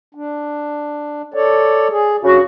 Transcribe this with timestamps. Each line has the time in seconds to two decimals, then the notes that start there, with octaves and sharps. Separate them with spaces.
0.15 D4
1.34 A4 C#5 D5
1.90 G#4
2.24 G2 C#3 F#4